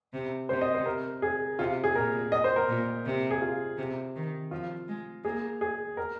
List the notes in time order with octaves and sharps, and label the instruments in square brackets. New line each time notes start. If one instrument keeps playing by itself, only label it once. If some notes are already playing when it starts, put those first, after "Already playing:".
[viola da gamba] C3
[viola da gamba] C3 [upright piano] C5
[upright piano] D#5
C5
A#4
G#4
[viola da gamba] C3 [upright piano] F4
[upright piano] G#4
[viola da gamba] A#2 [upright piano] A#4
[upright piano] D#5
C5
A#4
[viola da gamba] A#2
C3
[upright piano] G#4
F4
[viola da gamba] C3
D#3
[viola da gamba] F3 [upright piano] F4
[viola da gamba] G#3
[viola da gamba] A#3 [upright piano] G#4
[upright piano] G#4
A#4